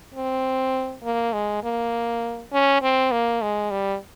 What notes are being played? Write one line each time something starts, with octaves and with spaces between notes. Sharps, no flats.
C4
A#3
G#3
A#3
C#4
C4
A#3
G#3
G3